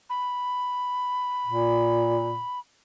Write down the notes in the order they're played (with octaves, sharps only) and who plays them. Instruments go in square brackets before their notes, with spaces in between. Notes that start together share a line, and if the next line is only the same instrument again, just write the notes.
[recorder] B5
[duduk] A#2